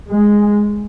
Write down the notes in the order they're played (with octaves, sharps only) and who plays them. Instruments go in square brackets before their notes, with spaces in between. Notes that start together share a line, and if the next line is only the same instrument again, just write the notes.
[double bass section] G#3